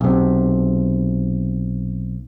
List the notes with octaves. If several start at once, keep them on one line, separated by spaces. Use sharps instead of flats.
B1 C3